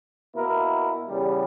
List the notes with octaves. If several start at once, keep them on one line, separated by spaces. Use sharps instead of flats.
B2 A#3 E4 A#4
E2 C#3 G3